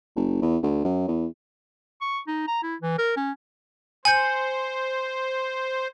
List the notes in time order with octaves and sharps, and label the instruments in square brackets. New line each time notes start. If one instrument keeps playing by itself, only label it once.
[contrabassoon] F#1
E2
D2
F#2
E2
[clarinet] C#6
D#4
A#5
E4
E3
A#4
C#4
[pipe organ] C5 [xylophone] G#5 [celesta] G6 C#7 F#7